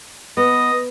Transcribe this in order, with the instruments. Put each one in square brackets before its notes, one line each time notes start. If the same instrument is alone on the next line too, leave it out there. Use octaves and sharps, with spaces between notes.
[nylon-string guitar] B3 [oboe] D#5